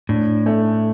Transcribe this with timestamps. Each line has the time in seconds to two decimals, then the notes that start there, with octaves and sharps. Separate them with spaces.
0.09 A2 D4
0.46 A3